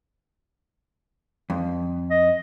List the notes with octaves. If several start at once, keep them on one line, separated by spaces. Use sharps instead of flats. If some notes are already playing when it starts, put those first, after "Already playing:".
F2
D#5